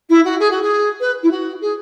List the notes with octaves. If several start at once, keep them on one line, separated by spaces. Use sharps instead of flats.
E4
F#4
G#4
F#4
G#4
B4
E4
F#4
G#4